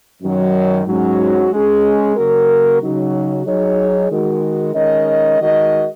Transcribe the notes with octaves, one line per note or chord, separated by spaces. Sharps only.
F#2 D#3 F#3
G#2 F#3 C#4 F#4
G#3 C#4 G#4
C#3 F#3 A#3 F#4 A#4
C#3 F#3 D#4 F#4
F#3 D#4 G#4 C#5
D#3 G#3 F#4 A#4
D#3 G#3 C#4 A#4 D#5
D#3 G#3 F#4 A#4 D#5